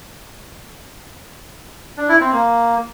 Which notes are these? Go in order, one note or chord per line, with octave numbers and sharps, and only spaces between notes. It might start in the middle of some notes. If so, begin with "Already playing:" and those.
D4
E4
C4
A#3